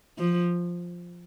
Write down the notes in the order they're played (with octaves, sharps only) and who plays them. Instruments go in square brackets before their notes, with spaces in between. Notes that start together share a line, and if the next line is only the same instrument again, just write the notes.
[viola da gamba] F3